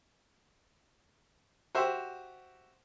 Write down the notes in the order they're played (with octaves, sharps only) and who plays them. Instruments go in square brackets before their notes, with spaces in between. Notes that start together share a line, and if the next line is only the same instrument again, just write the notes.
[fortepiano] F#4 G4 C5 E5